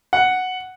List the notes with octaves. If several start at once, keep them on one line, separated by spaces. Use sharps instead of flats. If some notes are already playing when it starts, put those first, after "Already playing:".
F#5